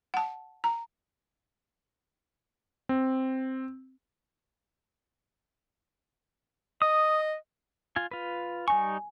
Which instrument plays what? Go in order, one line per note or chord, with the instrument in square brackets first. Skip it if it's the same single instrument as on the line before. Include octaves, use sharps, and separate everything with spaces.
[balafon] F#5 A5
A#5
[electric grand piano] C4
[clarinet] D#5 [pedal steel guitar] D#6
[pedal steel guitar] F4 G#5
F4 B4
[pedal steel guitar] G3 D#4 C#6 [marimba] G#5